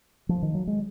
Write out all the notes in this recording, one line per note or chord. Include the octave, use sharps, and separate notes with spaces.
F3
D#3
F#3
G#3